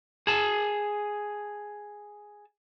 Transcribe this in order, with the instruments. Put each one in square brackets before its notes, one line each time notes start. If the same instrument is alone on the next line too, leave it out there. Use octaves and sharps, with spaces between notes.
[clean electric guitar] G#4 A5